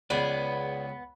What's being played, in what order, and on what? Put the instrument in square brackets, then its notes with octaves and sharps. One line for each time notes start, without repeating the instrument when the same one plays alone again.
[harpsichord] C#2 [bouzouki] B3 [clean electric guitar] G#4 D5